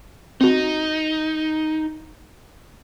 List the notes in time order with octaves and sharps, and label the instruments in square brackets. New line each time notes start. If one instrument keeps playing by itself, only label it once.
[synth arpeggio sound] C4 F#4 [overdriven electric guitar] D#4